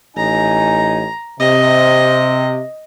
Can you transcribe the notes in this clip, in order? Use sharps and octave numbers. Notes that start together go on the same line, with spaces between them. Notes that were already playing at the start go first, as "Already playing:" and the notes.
A1 D#4 G#5 A#5
C3 D#5